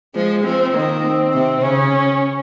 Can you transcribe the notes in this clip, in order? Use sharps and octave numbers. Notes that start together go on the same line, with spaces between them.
F3 G#3
F3 C4
D#3 A#3
C4
C3
C#3 C#4